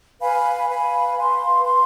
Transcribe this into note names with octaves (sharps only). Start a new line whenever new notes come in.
B4 F5 G#5 B5
B4 F5 G#5 B5
B4 F5 C6
B4 F5 C6